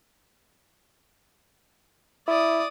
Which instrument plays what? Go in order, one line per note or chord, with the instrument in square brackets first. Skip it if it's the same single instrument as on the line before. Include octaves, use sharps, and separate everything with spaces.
[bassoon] E4 [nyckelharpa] D5 D#6